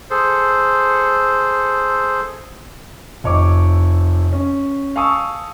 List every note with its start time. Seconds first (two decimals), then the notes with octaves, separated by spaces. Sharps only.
0.10 G#4 A4 C5
3.24 F1 C#5 D6
4.33 C#4
4.96 F5 G#5 A5 C#6 D#6 E6